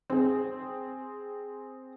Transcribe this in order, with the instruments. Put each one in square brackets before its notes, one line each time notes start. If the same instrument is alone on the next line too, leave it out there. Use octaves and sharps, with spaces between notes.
[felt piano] C4 G#4